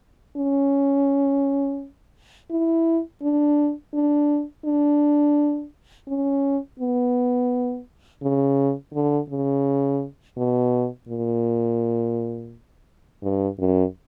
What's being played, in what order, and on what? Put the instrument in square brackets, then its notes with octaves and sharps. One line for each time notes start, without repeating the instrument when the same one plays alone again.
[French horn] C#4
E4
D4
D4
D4
C#4
B3
C#3
D3
C#3
B2
A#2
G2
F#2